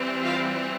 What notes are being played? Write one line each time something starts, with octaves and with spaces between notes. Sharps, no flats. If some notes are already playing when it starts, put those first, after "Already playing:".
Already playing: E3 G3 C4
F4 F5